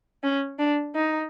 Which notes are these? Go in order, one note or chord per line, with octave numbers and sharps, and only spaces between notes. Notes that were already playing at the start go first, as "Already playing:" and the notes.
C#4
D4
D#4